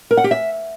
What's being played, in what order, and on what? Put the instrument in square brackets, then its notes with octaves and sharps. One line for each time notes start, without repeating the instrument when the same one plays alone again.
[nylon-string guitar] A#4
F#5
G4
E5